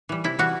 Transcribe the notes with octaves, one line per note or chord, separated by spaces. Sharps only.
E3 G3
C3 E4
E3 G3 F#4